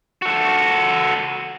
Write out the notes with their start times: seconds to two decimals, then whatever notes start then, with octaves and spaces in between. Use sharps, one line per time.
0.22 F#4 A4